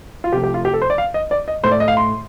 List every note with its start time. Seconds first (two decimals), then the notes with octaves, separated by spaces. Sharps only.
0.24 F4
0.32 C3 F3 A3 G4
0.44 G4
0.54 F4
0.65 G4
0.73 A4
0.82 C5
0.90 D5
0.98 F5
1.14 D#5
1.31 D5
1.48 D#5
1.63 A2 A3 C5
1.72 D5
1.80 D#5
1.88 F5
1.97 C6